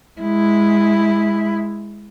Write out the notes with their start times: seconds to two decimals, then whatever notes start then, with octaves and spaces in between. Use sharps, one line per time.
0.21 G#3 E4